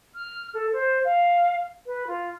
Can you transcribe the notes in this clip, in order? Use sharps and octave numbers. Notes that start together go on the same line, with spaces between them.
F6
A4
C5
F5
B4
F4